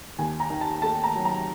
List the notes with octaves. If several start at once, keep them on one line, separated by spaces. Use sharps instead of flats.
D#2 G#5
A#5
D#3
A5
A3 A5
A#5
F#3
A#5